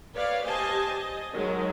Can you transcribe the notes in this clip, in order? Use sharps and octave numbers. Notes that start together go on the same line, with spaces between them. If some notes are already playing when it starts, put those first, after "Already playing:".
B4 C#5 D5 F5
G4 C5 D#5 G#5 A5
D#5
D#3 F#3 G#3